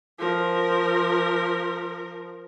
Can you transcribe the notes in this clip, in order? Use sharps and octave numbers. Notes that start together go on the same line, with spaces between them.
F3 A#4